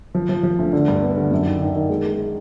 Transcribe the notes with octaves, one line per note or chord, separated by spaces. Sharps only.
F3
F3
F3
D2
D3
G2
B3
D3
F#2
D#3
D#3
D#3
G#3
G#3